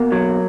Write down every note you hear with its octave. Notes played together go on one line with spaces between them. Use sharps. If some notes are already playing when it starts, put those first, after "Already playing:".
Already playing: B2 A#3
F#3